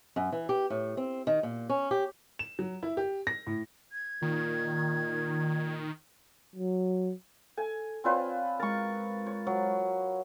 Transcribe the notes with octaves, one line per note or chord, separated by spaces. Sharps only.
F#2
E3
G4
A2
C4
D#3
A#2
C#4
G4
E7
F#3
E4
G4
A#6
A2
G#6
A#2 D#3
F#3
A4 G#5
C4 F4 B4 C#5 D5 G#5
G#3 A#4 C#6 A6
C#5
F#3